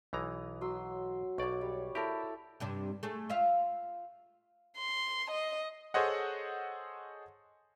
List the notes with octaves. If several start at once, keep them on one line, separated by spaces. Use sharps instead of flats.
B1 E3 A#5 D#6
F#3 C6 E6
B1 C#5 D5 D6
G3
E4 G4 A4 A#4
G2 C3 D4
A3 G#4
F4 E5 F5
C6
D#5
G#4 A4 C5 C#5 D#5 F#5